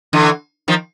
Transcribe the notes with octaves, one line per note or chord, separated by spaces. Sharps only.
D3 E3
D#3 F3